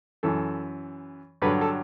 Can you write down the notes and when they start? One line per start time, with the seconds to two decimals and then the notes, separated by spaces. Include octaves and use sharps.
0.23 F#2 E3 A4
1.42 G2 D3 F#3 B4
1.61 A4